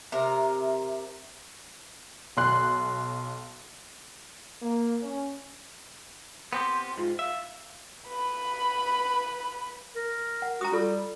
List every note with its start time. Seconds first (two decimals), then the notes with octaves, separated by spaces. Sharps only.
0.12 C3 A#4 E5
2.37 B1 C6 F#6
4.62 A#3
5.03 C#4
6.53 B3 C4 G4 C6
6.98 G#2 F4
7.19 E5 F5
8.08 B4 B5
9.95 A#4
10.42 F#5
10.61 F#4 A#5 D#6
10.72 G3 F4 A4